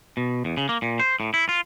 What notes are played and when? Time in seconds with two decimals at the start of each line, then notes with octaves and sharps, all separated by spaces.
0.17 B2
0.45 E2
0.57 C#3
0.69 A#3
0.82 A#2
1.00 C5
1.20 A2
1.34 E4
1.49 F4